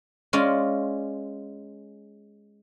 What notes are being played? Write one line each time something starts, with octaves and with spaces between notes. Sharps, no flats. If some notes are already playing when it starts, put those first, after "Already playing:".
G#3 C#4 F4 D5